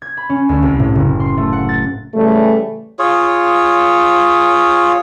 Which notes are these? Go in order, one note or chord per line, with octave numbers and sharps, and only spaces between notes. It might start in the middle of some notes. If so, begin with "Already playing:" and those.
G#6
B5
C#4
D2
C2
A2
F#1
C6
A3
F#5
A6
A2 C#3 E3 G3 A3
F4 G#4 C#5